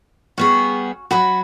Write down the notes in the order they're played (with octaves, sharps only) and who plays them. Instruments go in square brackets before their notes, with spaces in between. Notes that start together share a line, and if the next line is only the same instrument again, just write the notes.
[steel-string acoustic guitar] G3 B3 G#4 [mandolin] C#4 F#4 F#5
[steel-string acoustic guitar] F#3 F#4 [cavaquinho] F#5 B5